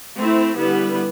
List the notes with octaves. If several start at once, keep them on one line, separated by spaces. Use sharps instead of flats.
A3 C4 E4
D3 G3 B3 E4 B4